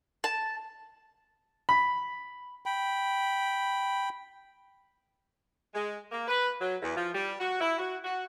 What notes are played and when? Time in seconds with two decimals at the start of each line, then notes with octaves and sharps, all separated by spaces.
0.24 A5
1.69 B5
2.66 G5 B5
5.74 G#3
6.11 A#3
6.27 B4
6.60 F#3
6.81 E2
6.96 F3
7.14 G3
7.39 F#4
7.60 E4
7.78 F#4
8.04 F#4